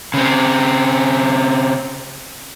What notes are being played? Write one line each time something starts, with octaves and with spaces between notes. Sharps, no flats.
C#3 C4